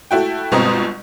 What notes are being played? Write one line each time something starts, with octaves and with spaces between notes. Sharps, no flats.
A3 E4 F#4 G5
G1 B2 G#3 C4 A#5 D#6